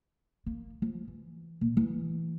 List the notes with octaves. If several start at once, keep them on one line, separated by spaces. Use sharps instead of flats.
A#3
F3
E3
A#2
E3